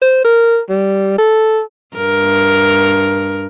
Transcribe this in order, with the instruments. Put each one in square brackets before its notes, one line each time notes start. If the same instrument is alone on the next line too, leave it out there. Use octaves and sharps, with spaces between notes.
[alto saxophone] C5
A#4
G3
A4
[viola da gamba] G2 A#4